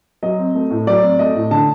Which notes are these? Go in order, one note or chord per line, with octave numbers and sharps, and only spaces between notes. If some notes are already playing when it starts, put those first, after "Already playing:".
F#3 D#5
C4
A3
A2
F#3 D5
C4
A3 D#5
A2
D3 A5